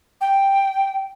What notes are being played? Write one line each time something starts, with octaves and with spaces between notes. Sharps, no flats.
G5